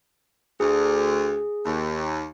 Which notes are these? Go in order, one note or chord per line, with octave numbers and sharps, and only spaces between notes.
D2 G#4
D#2